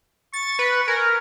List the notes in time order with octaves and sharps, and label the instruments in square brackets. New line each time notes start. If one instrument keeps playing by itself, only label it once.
[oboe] C#6 [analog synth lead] A6
[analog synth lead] B4
[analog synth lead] A#4 [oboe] G#5